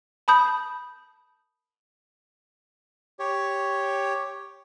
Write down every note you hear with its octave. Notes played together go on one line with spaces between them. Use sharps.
A5 B5 D#6 G6
G4 C#5